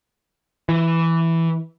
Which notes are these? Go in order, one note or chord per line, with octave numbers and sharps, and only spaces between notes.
E3